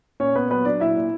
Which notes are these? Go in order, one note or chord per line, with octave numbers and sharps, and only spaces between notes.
A#2 C#4 C#5
A#2 B3 B4
F#3 B3 B4
F#3 D4 D5
A#2 E4 E5
A#2